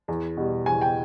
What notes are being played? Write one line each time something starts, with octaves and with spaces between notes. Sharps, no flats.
E2
B2 G3
E2 G#5
G5